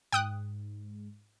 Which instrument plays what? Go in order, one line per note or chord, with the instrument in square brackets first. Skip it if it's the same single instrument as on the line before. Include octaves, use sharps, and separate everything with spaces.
[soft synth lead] G#2 [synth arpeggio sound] G5 D#6 F#6